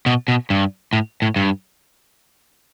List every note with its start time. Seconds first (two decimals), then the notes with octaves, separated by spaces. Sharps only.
0.06 B2
0.28 B2
0.50 G2
0.93 A2
1.22 A2
1.36 G2